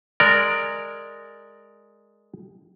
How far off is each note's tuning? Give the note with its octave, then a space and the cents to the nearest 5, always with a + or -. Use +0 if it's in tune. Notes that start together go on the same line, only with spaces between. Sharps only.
G#3 +0 A#4 -15 D5 +0